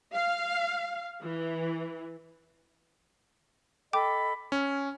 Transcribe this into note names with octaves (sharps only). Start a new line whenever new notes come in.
F5
E3
A4 D#5 G5 B5 D6
C#4